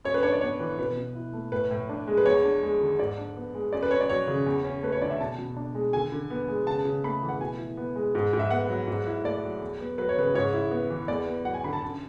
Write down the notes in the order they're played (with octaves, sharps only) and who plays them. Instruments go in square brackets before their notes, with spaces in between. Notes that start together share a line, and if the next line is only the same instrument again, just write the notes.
[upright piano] F#2 C#5
B4
D4 C#5
D5
B3 C#5
E3
B2 B4
B2
E4
A3
A2 B4
A2
D4
G#3
B4
E2 C#5
D4
G#3
D3
G#2 D5
D4
B3
G#3
F#2 D5
B4
F#2 C#5
D5
F#3 C#5
C#3
E2
C#4
A3 B4
C#5
D3 D5
E5
B2 A5
B2
D4
G#3
D3 G#5
D3
B3
G#3
C#3 A5
C#3
A3 B5
E3
F#5
B2 G#5
E4
B3
G#3
G#2
G#2
E5
B3 F#5
F#3
G#2
E4
A3 D5
F#3
E2
B3
F#3 B4
C#5
C#3 B4
G#2 C#5
E4
B3
E3
E2 D5
B3
F#3 F#5
G#5
D3 B5
A5
F#2